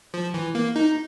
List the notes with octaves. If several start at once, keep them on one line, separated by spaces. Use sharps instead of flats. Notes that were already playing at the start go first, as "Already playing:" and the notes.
F3
E3
A#3
D#4